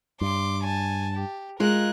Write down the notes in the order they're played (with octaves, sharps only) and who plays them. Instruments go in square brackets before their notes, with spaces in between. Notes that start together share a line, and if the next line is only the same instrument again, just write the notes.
[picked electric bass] G2 [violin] C6 D6
[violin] G#5 A5
G4
[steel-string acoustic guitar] G#3 F4 [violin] A#4 F#6